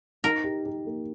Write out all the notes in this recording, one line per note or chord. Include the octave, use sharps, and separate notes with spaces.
D#4 A#4
G4
G4
A#3